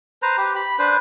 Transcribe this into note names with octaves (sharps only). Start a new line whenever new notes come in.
B4 C5 A#5
G4
B5
D4 B4 C5